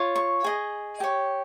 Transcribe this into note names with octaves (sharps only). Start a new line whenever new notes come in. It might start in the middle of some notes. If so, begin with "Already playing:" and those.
Already playing: F4 C#5
C#6
G#4 D#5
G4 C#5